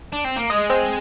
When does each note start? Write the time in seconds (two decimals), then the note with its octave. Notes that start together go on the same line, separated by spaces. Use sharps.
0.13 D4
0.25 C4
0.37 A#3
0.50 G#3 D#5
0.70 C4